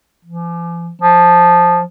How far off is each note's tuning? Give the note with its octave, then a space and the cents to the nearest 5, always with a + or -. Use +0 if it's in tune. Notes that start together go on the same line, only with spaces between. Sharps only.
F3 -45
F3 +5